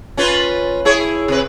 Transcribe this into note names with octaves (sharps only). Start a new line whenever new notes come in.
C#4 F4 B4
E4 G#4 C#5
C3 B4